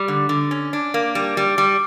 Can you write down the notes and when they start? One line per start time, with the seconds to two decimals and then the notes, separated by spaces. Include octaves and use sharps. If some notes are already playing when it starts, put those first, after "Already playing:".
Already playing: G3
0.08 D3
0.29 D3
0.51 C#4
0.73 D4
0.94 A#3
1.15 G3
1.37 G3
1.58 G3